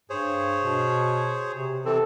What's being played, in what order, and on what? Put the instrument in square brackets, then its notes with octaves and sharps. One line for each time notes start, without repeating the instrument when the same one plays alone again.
[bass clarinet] G2 [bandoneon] G#4 C5 C#5
[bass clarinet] B2
C3
[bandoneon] C3 E3 C4 [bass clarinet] A4